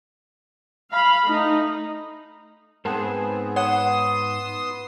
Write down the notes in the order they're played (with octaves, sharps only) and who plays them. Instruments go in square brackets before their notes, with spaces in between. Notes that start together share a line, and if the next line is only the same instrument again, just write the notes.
[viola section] F5 B5
A3 D#4
[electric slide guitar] G#2 C5 A5 [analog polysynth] B3 C4 G#4 [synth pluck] A#4
[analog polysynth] B3 C6 E7 [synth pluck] C#5 F#5 [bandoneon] D#6